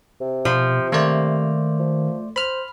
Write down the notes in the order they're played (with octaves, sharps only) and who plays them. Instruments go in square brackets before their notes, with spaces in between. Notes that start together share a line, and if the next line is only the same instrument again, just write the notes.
[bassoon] C3
[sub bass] B2 [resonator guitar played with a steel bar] F3
[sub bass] D#3 [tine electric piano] A3 C5 D5 [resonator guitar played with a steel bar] A#3
[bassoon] F3
[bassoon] C5 [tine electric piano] B5 F6